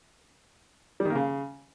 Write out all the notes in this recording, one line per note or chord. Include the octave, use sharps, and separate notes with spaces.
G3
D#3
A#3
C#3